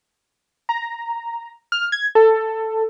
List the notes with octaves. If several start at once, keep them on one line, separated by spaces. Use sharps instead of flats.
A#5
F6
G#6
A4